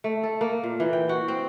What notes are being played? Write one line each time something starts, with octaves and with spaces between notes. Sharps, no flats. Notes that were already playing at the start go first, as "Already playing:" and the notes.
A3
A4
A#3
A#2
E3
G5
F#4
C4